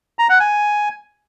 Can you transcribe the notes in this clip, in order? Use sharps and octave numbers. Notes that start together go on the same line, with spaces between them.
A#5
F#5
G#5